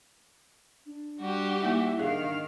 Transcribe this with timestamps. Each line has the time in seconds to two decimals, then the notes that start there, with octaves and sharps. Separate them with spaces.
0.86 D4
1.19 G3 F#4 G4
1.62 A#3 D#4 E4 E5
1.99 D#3 D4 G#4 F5